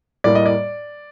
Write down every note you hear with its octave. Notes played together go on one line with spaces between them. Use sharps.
A2 G3 A#3 D5
D#5
D5